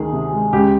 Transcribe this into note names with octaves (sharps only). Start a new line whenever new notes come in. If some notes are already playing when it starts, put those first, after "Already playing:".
Already playing: D2 D#3 G#4
C3
G#3
C#2 G4